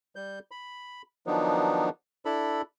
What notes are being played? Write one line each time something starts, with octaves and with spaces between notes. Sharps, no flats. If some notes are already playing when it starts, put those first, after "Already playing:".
G3 G6
B5
D#3 F3 F#3 B3 D4 D#4
D4 E4 A4 B5